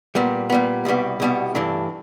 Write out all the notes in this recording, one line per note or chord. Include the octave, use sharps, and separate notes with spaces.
A#2 G3 B3
A#2 G3 B3
C2 B2 G3 B3
C2 B2 G3 B3
G2 E3 A3 D4